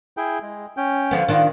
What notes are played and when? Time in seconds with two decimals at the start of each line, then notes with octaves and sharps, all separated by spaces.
0.17 E4 G#4 G5
0.42 G#3
0.77 C#4 G5
1.11 D3 F3 B3
1.28 D#3 D4 F4 F#5